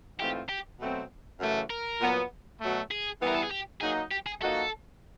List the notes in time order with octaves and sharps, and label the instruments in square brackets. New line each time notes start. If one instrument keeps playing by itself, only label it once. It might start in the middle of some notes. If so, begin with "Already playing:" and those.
[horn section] G#2 E3 A3 C4 F4 [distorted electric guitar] G4
[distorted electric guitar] G4
[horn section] B2 F#3 A3 C4
F#2 C#3 E3 A3
[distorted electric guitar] A#4
[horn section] A#2 F#3 B3
B2 F#3 A3
[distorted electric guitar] G#4
[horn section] E3 G3 B3 E4
[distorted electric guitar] A#4
A4
G#4
G4
[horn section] F#3 A#3 D#4 [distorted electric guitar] G#4
[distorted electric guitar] G4
G#4
[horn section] F3 A#3 D#4 F#4 [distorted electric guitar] A4